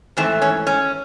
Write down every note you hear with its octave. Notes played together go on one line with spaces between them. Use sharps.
G#2 E3 A3 C4
C#4
C#4